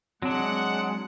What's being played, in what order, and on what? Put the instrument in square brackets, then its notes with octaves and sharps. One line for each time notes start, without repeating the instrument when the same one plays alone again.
[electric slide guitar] F#3 D4 [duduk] G#3 [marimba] C4 [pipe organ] F#5